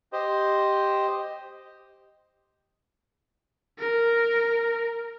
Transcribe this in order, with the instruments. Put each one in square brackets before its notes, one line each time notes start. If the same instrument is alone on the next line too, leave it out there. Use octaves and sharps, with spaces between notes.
[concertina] G4 C5 D#5
[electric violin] A#4